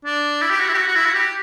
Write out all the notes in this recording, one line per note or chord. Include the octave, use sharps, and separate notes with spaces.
D4
E4
G4
F#4
E4
G4
F#4
F#4
E4
F#4
G4